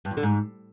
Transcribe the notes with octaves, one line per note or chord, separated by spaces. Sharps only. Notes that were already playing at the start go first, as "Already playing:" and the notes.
G2
E2
D3
G#2